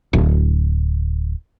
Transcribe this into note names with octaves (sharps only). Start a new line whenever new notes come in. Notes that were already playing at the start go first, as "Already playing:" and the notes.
D1